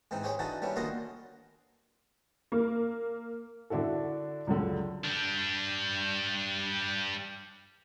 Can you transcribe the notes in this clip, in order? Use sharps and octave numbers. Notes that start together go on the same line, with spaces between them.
G#2 E3 C4 D#4
G4 G#4 C5 C#5 G5 B5
D3 E3 D#4 F#4 A4
G3 B3 C#4 E4
D#2 D3 F4 F#4 D#5 C6
A#3
D3 D4 E4 F#4 A4
C#2 F#2 D3
G3 D4